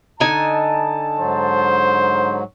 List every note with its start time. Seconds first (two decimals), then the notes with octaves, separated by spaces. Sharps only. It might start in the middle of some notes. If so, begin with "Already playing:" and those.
0.20 D3 D#4 G#5 A5
1.19 G#2 F#3 C5